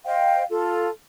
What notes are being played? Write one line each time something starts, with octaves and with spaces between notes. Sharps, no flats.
C5 D#5 F5 G5
F4 A4